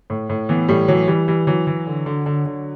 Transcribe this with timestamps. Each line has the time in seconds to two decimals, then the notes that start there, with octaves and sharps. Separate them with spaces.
0.10 A2
0.30 A2
0.49 E3 B3
0.68 A2 G3
0.88 E3 F#3
1.08 E3 G3
1.27 E3 G3
1.47 E3 F#3
1.67 E3
1.87 D3
2.06 D3
2.26 D3
2.45 D3